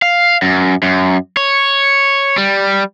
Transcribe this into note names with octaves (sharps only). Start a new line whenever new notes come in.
F5
F#2
F#2
C#5
G3